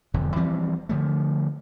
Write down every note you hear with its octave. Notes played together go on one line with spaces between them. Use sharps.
E1 F2 D3
E3 F3 G3 C4
D3 F3 A3